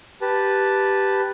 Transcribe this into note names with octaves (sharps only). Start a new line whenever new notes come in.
G4 B4 A5